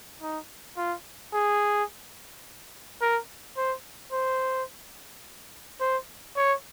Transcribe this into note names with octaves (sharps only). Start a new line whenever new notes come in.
D#4
F4
G#4
A#4
C5
C5
C5
C#5